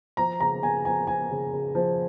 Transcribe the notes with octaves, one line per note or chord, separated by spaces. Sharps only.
F3 A#5
C#3 A#5
C#3 G#5
F3 G#5
F3 G#5
C#3
C#3
F3